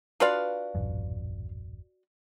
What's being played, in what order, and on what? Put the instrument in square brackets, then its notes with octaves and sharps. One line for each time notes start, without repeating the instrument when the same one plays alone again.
[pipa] D4 F4 F5 [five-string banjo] F#4 B4 D5
[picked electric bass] D#1 A1 F#2